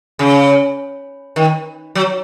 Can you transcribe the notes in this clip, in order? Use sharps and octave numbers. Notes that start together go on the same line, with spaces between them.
C#3
D#3
F#3